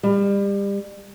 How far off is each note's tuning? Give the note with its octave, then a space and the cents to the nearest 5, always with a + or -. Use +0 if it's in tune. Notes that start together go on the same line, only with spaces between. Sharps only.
G3 +30